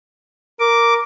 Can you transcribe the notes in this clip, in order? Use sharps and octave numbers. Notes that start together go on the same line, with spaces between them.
A#4 D6